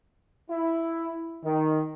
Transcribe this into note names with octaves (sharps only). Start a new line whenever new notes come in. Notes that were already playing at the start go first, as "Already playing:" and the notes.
E4
D#3